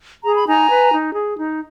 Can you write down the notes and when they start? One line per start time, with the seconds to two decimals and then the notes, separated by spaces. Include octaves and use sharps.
0.24 G#4 A#5
0.36 B5
0.47 D#4 G#5 A#5
0.69 B4
0.92 D#4
1.14 G#4
1.37 D#4